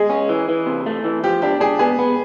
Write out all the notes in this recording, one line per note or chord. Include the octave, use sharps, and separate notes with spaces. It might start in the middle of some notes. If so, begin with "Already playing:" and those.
Already playing: G#3 G#4
C#4
E3
E3
C3
A3
E3
F3 G4
D4 G4
D4 G#4
B3 G#4
B3